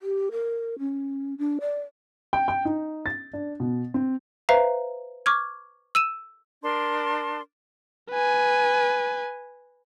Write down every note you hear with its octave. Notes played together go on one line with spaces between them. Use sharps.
G4
A#4
C#4
D4
D5
G5
G5
D#4
A6
D4
B2
C4
B4 C5 E5 F5 A#5
C#6 D6 F6 G#6
E6 D#7 E7
D4 A#4 A5 C6
B4 G#5